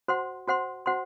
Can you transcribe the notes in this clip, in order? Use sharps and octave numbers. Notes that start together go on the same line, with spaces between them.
F#4 C5 F#5 C6
F#4 C5 F#5 C6
F#4 C5 F#5 C6